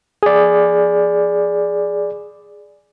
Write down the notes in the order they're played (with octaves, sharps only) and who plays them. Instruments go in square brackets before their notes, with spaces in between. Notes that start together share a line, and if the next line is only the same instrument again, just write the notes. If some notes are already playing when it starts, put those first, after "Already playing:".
[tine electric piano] G#4 D5